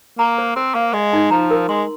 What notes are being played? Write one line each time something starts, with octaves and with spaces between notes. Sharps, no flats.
A#3 A#5
C5
C4 C5
A#3 F5
G#3 D#5
D#4
F3 A#5
A#4
G#3 C6